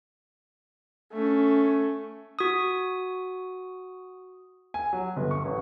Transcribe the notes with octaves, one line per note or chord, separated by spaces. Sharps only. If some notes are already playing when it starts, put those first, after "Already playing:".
A3 C#4
F#4 D#6
G#5
F#3
G1
C#6
A1